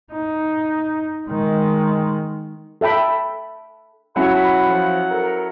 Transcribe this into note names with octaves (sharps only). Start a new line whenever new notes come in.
D#4
D#3 G#3
A4 E5 G5 B5
F#3 C#4 E4 A4 F#5 B5
F3
A4 A#4